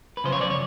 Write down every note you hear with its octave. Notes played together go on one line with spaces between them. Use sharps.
B4
F#2 C#3 F3 C5
C#5
D5
C#5